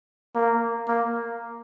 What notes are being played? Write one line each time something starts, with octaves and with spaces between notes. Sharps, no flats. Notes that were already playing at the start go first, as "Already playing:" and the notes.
A#3
A#3